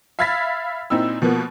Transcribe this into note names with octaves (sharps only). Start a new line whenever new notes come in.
E5 F5 B5 G#6 A6 B6
A#2 C4 D#4 E4 E6
B2 F3 A#3 B3